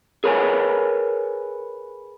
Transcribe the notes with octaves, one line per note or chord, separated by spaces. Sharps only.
G#4 A#4 B4 C#5 F#5 G#5